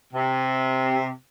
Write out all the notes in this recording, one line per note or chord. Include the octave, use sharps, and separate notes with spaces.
C3